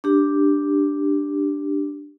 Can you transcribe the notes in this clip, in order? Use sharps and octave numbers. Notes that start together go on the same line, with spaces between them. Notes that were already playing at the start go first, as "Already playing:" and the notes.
D4 G4